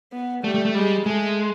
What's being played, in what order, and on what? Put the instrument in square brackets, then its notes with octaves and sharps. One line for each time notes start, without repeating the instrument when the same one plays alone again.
[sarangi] B3
[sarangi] G3 [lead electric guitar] A3
[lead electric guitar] A3
A3
[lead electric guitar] G3 [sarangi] G#3
[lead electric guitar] G#3 [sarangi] A3